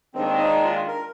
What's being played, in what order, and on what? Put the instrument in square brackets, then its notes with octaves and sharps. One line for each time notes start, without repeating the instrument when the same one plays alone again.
[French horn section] D#2 D#3 G#3 D4 [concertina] C4
[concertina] D#4
F4
A#4